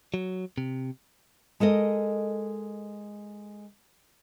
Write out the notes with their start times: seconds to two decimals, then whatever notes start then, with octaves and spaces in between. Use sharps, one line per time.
0.14 F#3
0.58 C3
1.60 G#3 A4 A#4 D#5